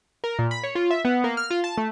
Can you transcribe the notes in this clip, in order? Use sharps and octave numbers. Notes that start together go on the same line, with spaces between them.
A#4
A#2
B5
C#5
F4
E5
B3
A#3
F6
F4
A5
A3